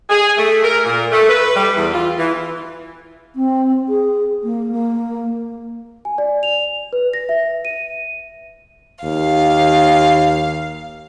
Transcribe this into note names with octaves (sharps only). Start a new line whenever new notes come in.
G#4
A3
A#4
A#2
A3
B4
G3
E2
F4
E3
C4
G#4
A#3
A#3
G#5
D5
F7
B4
A#6
E5
D#7
D#2 F5